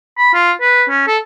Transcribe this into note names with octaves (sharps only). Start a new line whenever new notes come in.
B5
F4
B4
C#4
A4